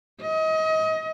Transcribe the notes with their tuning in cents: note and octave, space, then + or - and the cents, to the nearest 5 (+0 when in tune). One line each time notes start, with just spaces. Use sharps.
D#5 +30